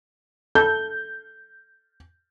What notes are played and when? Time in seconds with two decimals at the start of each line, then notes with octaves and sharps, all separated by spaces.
0.55 A4 G6